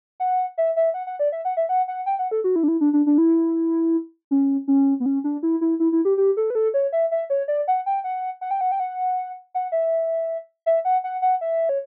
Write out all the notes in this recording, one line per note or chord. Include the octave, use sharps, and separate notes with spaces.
F#5
E5
E5
F#5
F#5
D5
E5
F#5
E5
F#5
F#5
G5
F#5
A4
F#4
E4
D4
E4
D4
D4
D4
E4
C#4
C#4
B3
C#4
D4
E4
E4
E4
E4
G4
G4
A4
B4
A4
C#5
E5
E5
C#5
D5
F#5
G5
F#5
F#5
G5
F#5
G5
F#5
F#5
E5
E5
F#5
F#5
F#5
E5
C#5